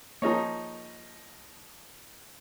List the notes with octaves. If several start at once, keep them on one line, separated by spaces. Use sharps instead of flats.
F3 A#3 D#4 G#4 C#5 A#5